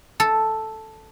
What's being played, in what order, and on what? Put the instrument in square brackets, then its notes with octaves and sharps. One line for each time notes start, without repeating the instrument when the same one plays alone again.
[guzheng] A4